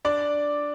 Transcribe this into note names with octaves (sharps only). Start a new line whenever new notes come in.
D4 D5